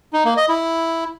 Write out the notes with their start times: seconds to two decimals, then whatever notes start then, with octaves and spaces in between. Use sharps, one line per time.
0.13 D#4
0.25 A#3
0.37 D#5
0.49 E4